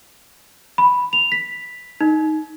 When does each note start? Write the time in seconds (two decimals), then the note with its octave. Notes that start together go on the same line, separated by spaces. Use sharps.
0.78 B5
1.13 F7
1.32 B6
2.01 D#4